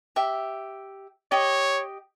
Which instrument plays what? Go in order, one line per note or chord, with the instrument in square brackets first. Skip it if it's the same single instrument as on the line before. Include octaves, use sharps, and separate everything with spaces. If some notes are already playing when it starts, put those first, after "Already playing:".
[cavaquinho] G4 E5
[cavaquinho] G4 D#5 [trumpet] C#5